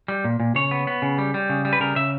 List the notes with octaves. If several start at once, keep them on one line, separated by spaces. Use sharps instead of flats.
G3
A#2
A#2
C#3 C#5
B3
B3
C#3
G3
G3
C#3
G3
B4
C#3 A#4
C#3 E5